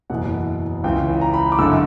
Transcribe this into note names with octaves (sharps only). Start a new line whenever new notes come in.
F#1 E2 B2 F#5
C#2 C#3 E3 G5
A#5
B5
D6
G1 F#2 D3 E6